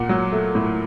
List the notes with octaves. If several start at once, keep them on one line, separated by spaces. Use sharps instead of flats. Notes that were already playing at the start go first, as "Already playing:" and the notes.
Already playing: A#2 F#5
F#3
A3
A2